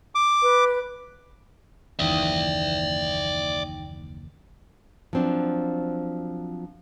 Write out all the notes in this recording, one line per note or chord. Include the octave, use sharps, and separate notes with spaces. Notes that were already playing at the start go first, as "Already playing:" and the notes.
D6
B4
F#1 D#2 E3 D#4 D5 E5 G5
F3 F#3 C4 D4